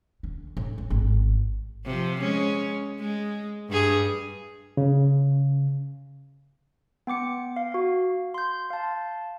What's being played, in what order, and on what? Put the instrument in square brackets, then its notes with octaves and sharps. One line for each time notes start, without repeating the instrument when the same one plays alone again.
[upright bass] D3
A2
A1
G#1
[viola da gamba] C3 F3
G#3 C#4
G#3
G2 G#4
[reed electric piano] C#3
[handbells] B3 G5 D6 C#7
F5
F#4 F5
C6 G6
F5 A5